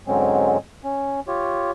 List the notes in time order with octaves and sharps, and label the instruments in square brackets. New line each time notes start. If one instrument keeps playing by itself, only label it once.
[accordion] G#2 D3 F#3 G#3 C4 C#4
C#4
F4 G4 C#5